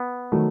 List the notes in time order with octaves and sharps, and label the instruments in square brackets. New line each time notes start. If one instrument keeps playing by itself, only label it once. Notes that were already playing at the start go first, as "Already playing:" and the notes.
Already playing: [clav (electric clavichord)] B3
[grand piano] D#3 F#3 A3